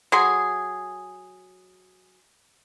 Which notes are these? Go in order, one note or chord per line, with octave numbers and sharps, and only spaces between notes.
F#3 G#4 C6